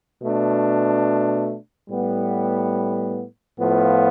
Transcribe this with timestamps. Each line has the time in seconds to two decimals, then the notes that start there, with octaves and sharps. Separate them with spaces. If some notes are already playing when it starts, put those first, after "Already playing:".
0.21 B2 A3 D4
1.90 A2 G3 B3
3.60 A2 F3 B3 F4